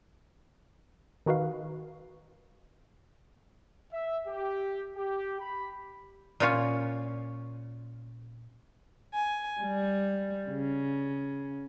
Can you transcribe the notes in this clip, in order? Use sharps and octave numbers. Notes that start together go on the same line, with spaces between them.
D#3 D#4 F#4 B4 F5
E5
G4
G4
B5
A#2 A#3 C#4 F4 C#5
G#5
G3
C#3